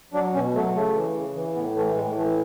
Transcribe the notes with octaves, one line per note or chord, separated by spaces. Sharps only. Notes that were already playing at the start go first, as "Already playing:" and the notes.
F#3 D4
B2 C#4
F#3 A3
C#3 A3
E3
C#3
E3
A2 B3
E3 A3
A2 G#3
E3 A3